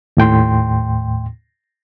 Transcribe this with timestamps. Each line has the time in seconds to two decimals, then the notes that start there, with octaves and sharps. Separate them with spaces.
0.17 D#2 A2 G5 C6